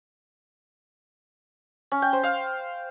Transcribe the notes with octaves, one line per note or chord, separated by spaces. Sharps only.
C#4
G5
C5
F5